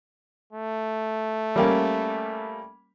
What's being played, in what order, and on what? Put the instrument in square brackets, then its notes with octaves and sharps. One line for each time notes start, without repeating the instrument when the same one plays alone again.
[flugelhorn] A3
[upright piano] G3 A#3 C#4